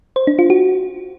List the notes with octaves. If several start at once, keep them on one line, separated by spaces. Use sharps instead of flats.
C5
D4
F4
F#4